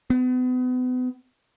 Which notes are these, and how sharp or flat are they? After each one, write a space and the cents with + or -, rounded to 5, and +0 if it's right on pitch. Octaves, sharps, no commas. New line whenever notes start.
B3 +35